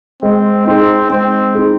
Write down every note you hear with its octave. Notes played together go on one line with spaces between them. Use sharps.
G#3 C4
C4 D#4 G#4
G#3 C4
D#4 G#4